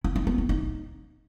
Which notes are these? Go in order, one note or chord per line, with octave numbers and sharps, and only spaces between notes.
E4
D#4
B3
E4
D#4